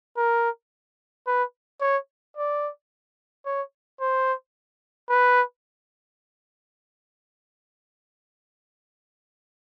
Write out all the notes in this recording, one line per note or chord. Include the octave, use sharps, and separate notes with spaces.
A#4
B4
C#5
D5
C#5
C5
B4